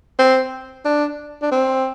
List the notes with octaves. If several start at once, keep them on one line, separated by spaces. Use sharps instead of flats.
C4
D4
D4
C4